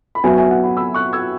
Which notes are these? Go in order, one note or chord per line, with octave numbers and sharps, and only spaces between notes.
B5
F#2 F#3 B3 E5 G#5
E5 G#5
F#5
F#5 B5
B5 E6
C#6 F#6
E6 G#6